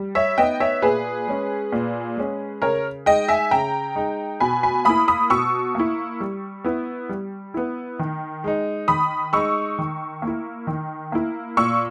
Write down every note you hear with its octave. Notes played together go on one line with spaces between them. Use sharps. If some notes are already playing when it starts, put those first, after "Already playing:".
Already playing: G3
C#5 E5
B3 D#4 D#5 G5
C#5 E5
A#2 G#4 B4
G#3 C#4
A#2
G#3 C#4
C#3 A#4 C#5
G#3 D#4 D#5 G5
E5 G#5
C#3 G5 A#5
G#3 D#4
B2 G#5 B5
G#5 B5
A#3 E4 B5 D#6
B5 D#6
B2 C#6 E6
A#3 E4
G3
B3 E4
G3
B3 E4
D#3
G#3 D#4
D#3 B5 D#6
G#3 D#4 C#6 E6
D#3
A#3
E4
D#3
A#3 E4
A#2 C#6 E6